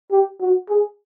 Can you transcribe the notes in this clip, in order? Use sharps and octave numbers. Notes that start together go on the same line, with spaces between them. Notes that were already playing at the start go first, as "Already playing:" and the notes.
G4
F#4
G#4